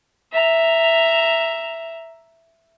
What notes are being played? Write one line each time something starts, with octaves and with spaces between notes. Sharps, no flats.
E5 A#5